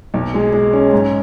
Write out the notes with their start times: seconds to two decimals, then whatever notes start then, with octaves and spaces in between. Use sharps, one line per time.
0.14 B1
0.34 G#3
0.53 G#3
0.73 C#4
0.93 G#2